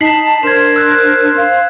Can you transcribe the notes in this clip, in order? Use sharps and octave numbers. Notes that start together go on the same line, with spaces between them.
D#4 A5 B6 C7 F#7
D4 A#4 C5 G#6 E7
E6 F#6 G#6
F5